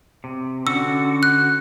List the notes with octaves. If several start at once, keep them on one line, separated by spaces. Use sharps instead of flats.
C3
D3 C#4 F#4 E6
F#6